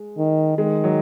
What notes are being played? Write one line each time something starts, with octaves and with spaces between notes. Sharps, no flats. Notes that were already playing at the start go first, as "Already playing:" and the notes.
Already playing: G#3
D#3
D#3 G#3
F#3